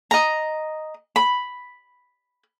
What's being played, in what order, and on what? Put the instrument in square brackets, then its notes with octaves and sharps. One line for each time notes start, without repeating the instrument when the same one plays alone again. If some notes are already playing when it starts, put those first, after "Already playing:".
[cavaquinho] D#5 A#5
B5